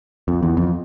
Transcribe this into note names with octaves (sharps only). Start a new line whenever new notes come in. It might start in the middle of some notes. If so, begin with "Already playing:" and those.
F2
E2
F2